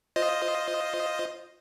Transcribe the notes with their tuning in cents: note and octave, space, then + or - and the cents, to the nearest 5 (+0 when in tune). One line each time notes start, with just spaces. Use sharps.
F4 +0 C5 +0 D#5 +0